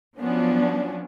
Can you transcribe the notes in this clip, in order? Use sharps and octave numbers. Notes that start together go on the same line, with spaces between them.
F3 F#3 B3 C#4 D4